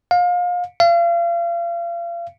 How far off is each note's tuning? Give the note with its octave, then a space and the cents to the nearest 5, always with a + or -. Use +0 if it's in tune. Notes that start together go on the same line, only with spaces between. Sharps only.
F5 +30
F5 -35